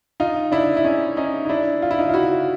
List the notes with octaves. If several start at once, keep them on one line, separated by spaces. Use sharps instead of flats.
D#4 F4
D4 E4
E4
C#4 D#4
C#4 D#4
D#4
D4 E4
F4
E4
D#4 F4
F4
E4 F#4